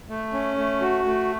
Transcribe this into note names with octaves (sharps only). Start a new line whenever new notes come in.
A3
C#4
A3
F#4
A3